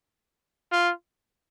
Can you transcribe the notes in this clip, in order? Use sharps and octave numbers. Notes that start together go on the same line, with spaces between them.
F4